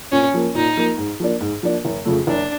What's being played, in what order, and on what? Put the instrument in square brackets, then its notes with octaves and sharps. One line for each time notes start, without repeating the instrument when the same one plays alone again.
[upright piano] A#2 [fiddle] C#4
[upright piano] F3 A#3
[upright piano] A#2 [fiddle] D#4
[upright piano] F3 A#3
G#2
F3 A#3 D4
G#2
F3 A#3 D4
F#1
F2 C#3 F3 A3
[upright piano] F#1 [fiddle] D4